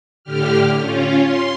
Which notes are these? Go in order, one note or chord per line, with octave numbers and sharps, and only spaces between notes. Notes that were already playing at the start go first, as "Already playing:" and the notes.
A2 D3 G4 F6
C#4 F4
C6